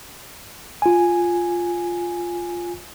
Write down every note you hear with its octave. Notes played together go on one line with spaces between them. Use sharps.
F4 G#5